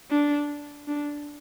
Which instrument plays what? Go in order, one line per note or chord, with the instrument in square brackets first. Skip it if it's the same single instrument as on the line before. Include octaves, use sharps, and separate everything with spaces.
[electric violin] D4
D4